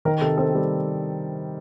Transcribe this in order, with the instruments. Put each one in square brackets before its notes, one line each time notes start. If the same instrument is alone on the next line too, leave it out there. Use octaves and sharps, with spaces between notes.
[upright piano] D#3 A#4
C3 A4
C4 A4
G3